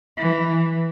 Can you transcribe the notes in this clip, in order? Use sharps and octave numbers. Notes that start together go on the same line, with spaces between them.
E3